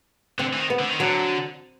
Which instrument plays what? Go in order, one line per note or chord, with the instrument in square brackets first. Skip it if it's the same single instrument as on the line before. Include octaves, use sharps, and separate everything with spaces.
[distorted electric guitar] D3 [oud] C4
[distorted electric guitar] E3
D#3
[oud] B3
[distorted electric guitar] D3
D#3
[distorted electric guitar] D3 [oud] F#3